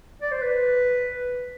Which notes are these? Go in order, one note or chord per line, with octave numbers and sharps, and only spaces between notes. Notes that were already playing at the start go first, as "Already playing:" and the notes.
D5
C5
B4